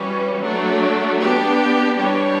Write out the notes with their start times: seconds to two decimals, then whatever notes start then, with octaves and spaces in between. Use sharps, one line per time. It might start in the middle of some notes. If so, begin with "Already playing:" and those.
Already playing: E3 G3 C#4 F#4 B4
0.42 F#3 A3 D4
1.20 B3 D4 G4
1.97 E3 G3 D4 G4 C#5